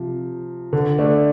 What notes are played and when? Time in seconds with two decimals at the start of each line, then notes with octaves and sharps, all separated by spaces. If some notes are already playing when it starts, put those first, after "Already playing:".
Already playing: C3 F3
0.73 D3
0.98 A3 D4